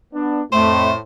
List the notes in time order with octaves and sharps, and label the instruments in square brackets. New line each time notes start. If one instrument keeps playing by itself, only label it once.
[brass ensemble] B3 D4
[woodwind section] F2 A3 [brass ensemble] A2 [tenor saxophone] C5